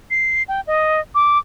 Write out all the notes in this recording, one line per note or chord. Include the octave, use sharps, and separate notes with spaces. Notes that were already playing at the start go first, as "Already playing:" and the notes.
C7
G5
D#5
D6